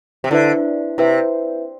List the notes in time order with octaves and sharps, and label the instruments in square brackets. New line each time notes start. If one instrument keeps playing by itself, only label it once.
[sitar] C3
[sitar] D3 [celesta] E4 B4 E5
[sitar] C3 [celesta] E4 B4 E5